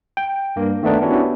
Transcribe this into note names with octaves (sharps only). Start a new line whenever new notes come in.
G5
G2 A#3
D#3 A3 B3 D4 D#4
B3 C#4 D4 E4 F#4 G4